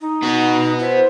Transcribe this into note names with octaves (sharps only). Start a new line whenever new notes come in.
D#4
B3 F#4
E4 C5